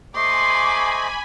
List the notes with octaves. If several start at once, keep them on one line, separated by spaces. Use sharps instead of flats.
A3 C5 D#5 G#5 B5 C6 D6